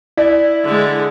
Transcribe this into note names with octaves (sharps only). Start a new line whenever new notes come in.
E4 D5
D3 G#3